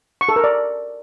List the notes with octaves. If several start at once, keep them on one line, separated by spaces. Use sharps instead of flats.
C#6
A4
A#4
D5